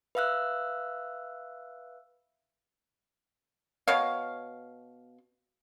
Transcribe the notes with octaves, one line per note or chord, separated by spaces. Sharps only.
B4 E5 F5 E6 F#6
B2 C#5 F5